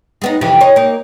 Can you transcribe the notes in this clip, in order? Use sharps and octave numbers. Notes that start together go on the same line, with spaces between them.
G#3 B3 D#4
F2 C3 E3
C#5 D#5
A#3 D#4